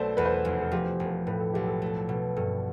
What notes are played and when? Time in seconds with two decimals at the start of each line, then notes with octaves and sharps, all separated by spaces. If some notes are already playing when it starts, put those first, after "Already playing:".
Already playing: B1 A3 C5 D5
0.17 E2 B4
0.25 C5
0.33 B4
0.45 F1
0.61 A4
0.72 F3 G4
1.00 E1
1.27 A2 B4
1.40 A4
1.54 B1 G4
1.67 A4
1.82 A3
2.09 B2
2.37 G2 A4